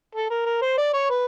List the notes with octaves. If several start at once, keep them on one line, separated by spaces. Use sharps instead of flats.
A4
A#4
A#4
C5
D5
C#5
B4